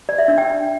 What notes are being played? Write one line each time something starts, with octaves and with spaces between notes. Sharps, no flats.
D5
E5
D4
G5